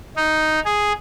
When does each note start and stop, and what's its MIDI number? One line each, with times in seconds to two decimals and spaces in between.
0.17 0.60 63
0.65 0.93 68